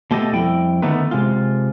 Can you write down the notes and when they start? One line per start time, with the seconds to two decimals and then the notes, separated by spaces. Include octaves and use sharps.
0.11 B2 A3 G4 A4 D#5
0.33 F2 G3 E4 G5
0.82 D3 D#3 A3 B3 D#4 B4
1.11 C3 G#3 F4